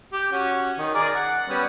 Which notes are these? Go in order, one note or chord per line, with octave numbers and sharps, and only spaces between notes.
G4
C#4 F#4
D#3
G#4 A#4 D5
F#5
G3 B3 C#4